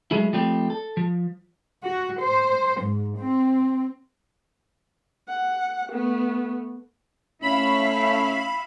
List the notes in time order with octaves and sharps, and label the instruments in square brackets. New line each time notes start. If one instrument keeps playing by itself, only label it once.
[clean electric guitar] F#3 G#3 A3 E4
F3 G3 A3 C4 G4
A4
F3
[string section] F#4
C5
G#2
C4
[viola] F#5
A3 B3
[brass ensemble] A3 C#4 [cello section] E4 E5 F5 [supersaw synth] B5